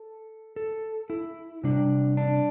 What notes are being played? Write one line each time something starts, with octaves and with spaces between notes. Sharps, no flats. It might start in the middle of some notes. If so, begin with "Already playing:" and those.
Already playing: A4
A4
E4
C3 G3 D4
D4